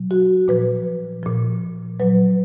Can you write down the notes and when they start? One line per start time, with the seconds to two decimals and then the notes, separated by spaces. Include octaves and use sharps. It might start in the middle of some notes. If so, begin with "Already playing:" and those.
Already playing: B2 F#3
0.11 F#4
0.48 A#2 F3 B4
1.23 A#2 F3
2.00 A#2 F#3 B4